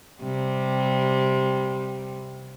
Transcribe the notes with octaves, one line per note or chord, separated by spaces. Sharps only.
C3 G3